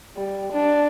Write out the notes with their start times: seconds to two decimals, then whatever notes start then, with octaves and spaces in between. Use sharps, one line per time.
0.17 G3
0.52 D4